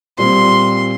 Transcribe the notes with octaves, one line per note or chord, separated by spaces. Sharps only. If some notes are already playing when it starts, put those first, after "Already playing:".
A#2 G3 C4 C6